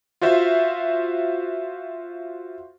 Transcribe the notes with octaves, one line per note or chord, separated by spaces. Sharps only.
F4 F#4 C5 E5